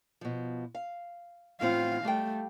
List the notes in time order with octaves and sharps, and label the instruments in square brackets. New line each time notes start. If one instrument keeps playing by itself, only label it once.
[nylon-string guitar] B2 F3
F5
[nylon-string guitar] A2 C4 F#5 [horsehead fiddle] F4 F5
[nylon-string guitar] G3 F5 G5 [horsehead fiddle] A3